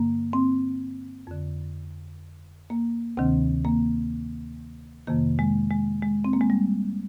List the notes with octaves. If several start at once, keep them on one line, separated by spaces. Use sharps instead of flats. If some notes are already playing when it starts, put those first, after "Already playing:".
Already playing: G2 D3 A#3
C4
F2 D3
A#3
D2 C3 D#3 C4
A#3
F2 C3 D#3 A#3
G#3
G#3
G#3
C4
A#3
G#3
G3